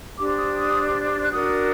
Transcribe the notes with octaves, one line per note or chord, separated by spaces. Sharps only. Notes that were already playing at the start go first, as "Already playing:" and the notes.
D4 G4 C5 D6
D#6
D#6
F#6
D4 F#4 A#4 D#6